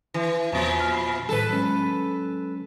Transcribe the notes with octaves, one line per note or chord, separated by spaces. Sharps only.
E3
E2 A#2 F3
F6
B5 C7
A2 D#3 G3 A4 B4
F#3 G#3 C#4